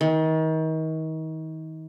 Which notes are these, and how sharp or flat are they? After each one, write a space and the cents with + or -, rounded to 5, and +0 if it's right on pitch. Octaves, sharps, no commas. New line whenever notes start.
D#3 +35